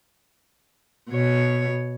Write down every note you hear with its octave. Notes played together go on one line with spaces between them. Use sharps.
B2 C#5